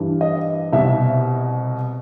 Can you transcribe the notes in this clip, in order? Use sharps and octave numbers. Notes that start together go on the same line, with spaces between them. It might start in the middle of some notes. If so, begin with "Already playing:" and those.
Already playing: G2 E3
D#5
C2 B2 E5